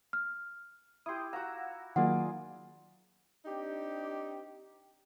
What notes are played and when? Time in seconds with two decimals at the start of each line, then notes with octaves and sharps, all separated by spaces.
0.13 F6
1.06 E4 G4 C6 D#6
1.33 F#4 F5 F#5 A#5 E6
1.96 D#3 F#3 A#3 F4 G#4 D5 F#5
3.46 C4 D4 D#4 G4